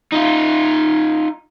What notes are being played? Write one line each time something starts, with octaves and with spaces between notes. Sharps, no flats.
D#4 F4